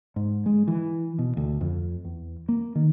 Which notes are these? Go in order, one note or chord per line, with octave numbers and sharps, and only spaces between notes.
G#2
G#3
E3
B2
D2
F2
E2
A#3
D#3